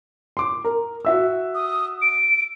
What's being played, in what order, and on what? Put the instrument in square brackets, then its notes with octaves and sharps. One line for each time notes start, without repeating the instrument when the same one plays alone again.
[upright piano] C6 D6
A#4
F#4 E5 E6
[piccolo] D#6
D7